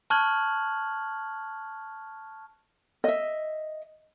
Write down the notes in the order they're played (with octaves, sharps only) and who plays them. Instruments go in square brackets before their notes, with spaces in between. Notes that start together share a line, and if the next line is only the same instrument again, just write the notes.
[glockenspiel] A5 C#6 F6 F#6 G#6 F#7
[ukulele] D#5 E5